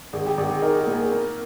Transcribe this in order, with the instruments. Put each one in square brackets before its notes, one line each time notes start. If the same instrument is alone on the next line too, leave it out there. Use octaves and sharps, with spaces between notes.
[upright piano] G#1 [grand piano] G#4
[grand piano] G4
[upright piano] G#1 [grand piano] G4
[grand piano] G#4
[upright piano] D#4 [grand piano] A#4
[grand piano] G#4
[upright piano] A#2 [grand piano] G#4
[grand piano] A#4
[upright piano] A#3